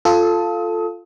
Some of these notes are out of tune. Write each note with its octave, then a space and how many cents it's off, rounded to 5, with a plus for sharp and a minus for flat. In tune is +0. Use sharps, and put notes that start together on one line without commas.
F4 +0 A4 +0 D#6 +35